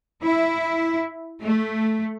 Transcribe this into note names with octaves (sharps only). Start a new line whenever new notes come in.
E4
A3